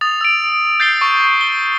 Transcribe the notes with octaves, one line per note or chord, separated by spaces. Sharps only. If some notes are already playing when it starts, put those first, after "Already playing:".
D#6 A6 F7
E6 D7
G6 A6 C7 D7 G7
C#6
G7